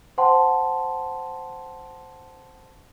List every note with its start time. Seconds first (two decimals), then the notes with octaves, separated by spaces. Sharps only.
0.18 C5 F#5 G5 A5 C6